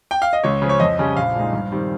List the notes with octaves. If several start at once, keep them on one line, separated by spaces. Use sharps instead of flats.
G5
F5
D#5
C#2 C#5
C#3 F3
C#5
F2 D#5
C#3 G3 C#4
A#1 F5
A#2 G#3 D#4
G2
D#3 G3 C4